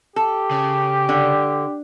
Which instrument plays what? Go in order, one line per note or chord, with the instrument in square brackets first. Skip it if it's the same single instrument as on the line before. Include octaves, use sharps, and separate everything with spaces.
[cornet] G4 [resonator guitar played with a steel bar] A4
[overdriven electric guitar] C#3
[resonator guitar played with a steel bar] D3